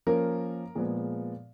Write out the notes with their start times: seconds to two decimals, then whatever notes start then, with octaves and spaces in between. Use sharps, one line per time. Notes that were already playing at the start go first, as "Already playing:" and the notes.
0.07 F3 A#3 C#4 A#4
0.75 A#2 F3 G#3 B3 G#4